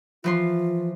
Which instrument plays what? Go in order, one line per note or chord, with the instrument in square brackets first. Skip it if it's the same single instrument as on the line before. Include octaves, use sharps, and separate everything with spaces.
[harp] E3 F3 C6 [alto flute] F4